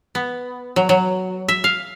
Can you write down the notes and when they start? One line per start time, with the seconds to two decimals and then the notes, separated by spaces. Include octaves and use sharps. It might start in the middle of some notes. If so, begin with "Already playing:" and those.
0.15 B3
0.76 F#3
0.89 F#3
1.48 E5
1.64 F5